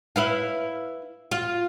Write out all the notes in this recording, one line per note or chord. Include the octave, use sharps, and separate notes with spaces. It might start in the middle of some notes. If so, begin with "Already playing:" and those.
E4 B4 F5
F4